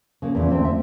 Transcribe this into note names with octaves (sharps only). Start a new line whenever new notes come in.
C#3 A#3
E2 A#2
D2 C4 E5
E5